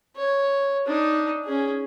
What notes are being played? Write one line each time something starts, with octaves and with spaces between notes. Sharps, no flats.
C#5
D4 D#4
C#4 G#4